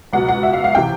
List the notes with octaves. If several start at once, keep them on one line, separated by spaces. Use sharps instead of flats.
C#2 B2 F#3 F#5
F#5
E5
F5
F5
C3 E3 G5